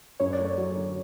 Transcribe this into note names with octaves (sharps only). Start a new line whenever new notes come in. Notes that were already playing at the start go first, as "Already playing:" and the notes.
F#2 C#5
D5
A3
C#5
F#3
D3